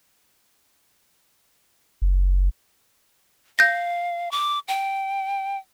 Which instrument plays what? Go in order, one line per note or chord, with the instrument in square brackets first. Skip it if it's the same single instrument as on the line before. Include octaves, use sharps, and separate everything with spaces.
[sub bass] F#1
[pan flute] F5 [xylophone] G6 A#6
[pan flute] D6
G5